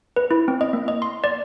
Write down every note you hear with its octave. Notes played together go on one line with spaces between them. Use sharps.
B4
E4
C4
D#5
A#3
D#5
C6
D5